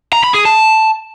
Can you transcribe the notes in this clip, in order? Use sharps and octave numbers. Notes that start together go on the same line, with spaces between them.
A#5
B5
G#4
A5